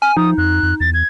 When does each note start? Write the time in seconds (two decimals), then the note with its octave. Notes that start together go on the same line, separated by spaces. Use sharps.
0.02 G#5 F6
0.17 F3 D#4 D#6
0.38 F2 F#6
0.63 F2
0.80 E2 A6
0.94 G#6